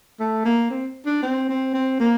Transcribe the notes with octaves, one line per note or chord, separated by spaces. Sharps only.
A3
A#3
C4
D4
C4
C4
C4
A#3